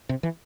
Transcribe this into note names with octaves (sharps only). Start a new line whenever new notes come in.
C3
E3